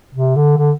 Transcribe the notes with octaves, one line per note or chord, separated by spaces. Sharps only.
C3
D3
D3